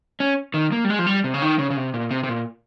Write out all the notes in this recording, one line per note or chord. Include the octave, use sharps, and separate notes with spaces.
C#4
D#3
A#3
G3
G#3
F3
G3
C3
C#3
D#3
C#3
C#3
C3
A#2
C3
C3
A#2